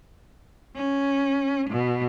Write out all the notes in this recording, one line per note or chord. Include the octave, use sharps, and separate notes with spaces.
C#4
B2